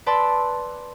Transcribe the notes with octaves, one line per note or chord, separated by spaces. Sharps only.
B4 D5 A5 C6 E6